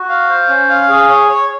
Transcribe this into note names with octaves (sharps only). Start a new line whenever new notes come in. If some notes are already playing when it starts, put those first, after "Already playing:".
Already playing: F#4
F5
C5
C#4
F5
G#4
C#5
C#5